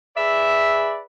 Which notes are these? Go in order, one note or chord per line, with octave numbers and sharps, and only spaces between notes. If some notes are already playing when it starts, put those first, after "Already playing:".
G#4 B4 D5 E5